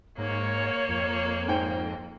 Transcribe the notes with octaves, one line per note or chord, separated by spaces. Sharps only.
G#2 A#3 C#5
F2
G#2 C5 G5